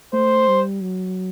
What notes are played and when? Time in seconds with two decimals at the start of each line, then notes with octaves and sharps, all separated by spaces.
0.13 A3 C5
0.48 G3
0.82 F#3